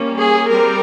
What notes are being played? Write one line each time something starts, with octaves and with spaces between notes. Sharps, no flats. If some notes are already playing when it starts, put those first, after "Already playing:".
Already playing: G3 A#3 C#4
G#4
G3 C4 A#4